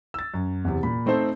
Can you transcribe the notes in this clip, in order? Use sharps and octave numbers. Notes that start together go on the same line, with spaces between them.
E6 A6
F#2
E2 C3
A#2 B5
A3 C4 D#4 A4 C5